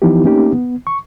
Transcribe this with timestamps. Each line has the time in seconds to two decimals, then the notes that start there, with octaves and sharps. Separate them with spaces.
0.02 E3 F3 B3 D#4 E4 G4
0.25 A3 A#3 C4 C#4 D#4 G4
0.52 B3
0.87 C#6